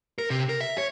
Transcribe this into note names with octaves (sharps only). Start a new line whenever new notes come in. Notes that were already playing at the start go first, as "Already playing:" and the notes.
A#4
C3
A#4
E5
C#5